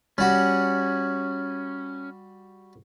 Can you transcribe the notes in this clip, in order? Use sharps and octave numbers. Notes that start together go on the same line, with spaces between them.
G3 C#4 F#4